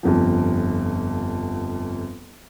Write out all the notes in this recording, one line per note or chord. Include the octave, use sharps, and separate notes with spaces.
G1 F2 F3